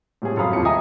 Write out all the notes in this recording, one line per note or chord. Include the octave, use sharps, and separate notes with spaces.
A2 G3 C4 G#4
F#2 C4 A4 F5 B5 D#6
D#1 F2 C#7
D#5 E5 G5 G#5 A#5 D#6